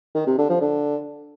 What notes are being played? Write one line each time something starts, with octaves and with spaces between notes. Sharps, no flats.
D#3
C3
D3
F3
D3